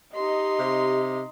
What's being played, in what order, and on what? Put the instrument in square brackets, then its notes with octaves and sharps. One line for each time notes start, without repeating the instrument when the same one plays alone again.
[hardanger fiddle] D#4 C6 [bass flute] G4 [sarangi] D#5
[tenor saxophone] C3